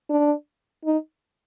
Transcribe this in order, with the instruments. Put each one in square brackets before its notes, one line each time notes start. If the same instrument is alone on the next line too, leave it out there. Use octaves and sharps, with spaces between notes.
[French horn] D4
D#4